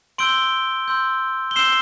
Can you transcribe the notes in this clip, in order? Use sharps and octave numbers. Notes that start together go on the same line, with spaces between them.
C6 E6 G6 D7 G7
C6 E6 G6
G7
C6 E6 G6 C7 E7